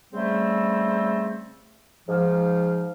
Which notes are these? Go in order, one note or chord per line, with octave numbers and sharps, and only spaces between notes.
C#3 G3 A3 C4
G#2 F3 D#4 F5